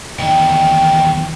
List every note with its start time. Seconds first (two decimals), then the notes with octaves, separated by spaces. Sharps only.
0.19 E2 D#3 D#5 G5